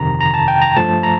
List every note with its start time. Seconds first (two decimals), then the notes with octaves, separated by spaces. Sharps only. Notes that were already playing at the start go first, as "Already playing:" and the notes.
Already playing: G1 F2 C3 D#3 A#5
0.21 A#5
0.34 A5
0.48 G5
0.62 A#5
0.76 G2 F3 A3 A5
1.03 A#5